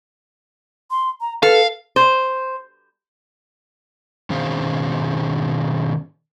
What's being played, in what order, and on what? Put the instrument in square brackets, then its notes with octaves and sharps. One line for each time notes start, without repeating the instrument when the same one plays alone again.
[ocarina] C6
A#5
[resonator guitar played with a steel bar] A4 [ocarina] B4 [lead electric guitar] F5
[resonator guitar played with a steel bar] C5
[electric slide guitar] B2 D#3 C#4 G#4 C5 F5